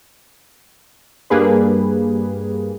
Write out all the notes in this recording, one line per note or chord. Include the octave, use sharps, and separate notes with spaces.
G2 G3 A#3 G#4 B4